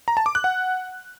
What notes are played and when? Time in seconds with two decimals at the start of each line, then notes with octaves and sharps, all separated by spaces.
0.08 A#5
0.17 A5
0.26 D6
0.35 F#6
0.44 F#5